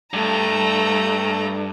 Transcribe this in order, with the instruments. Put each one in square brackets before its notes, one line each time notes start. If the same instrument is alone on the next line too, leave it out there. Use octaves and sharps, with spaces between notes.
[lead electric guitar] G2 [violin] A3 A#5